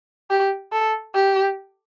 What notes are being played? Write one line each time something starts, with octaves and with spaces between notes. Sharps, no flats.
G4
A4
G4